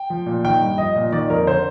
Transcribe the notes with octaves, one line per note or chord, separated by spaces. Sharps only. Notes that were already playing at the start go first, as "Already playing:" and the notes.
Already playing: G5
F3
A#2
D#3 G5
G2
F3 D#5
A#2
D#3 D5
F2 A#4
D3 C5